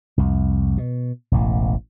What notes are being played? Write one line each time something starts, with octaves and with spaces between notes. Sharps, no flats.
C2 F2
B2
E1 A1 A2